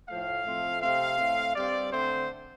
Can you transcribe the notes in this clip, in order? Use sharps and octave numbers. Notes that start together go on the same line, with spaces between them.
A2 F3 A3 F5
A2 F3 A3 C4
C3 A3 C4 F5
A2 A3 C4
G2 G3 C4 D5
D3 A3 C4 C5